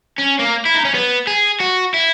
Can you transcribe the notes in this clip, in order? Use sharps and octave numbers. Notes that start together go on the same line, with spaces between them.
C#4
A#3
E4
D#4
C#4
B3
G#4
F#4
E4